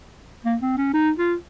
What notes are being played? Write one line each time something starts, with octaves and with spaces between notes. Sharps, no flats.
A#3
C4
C#4
D#4
F4